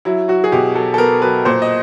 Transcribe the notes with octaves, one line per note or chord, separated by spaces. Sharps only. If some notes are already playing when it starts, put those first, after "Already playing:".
F#3 E4
F#3 F#4
G#4
B2 G4
F#3 A4
A4
B3 A#4
F#3 B4
A#2 C5
D#5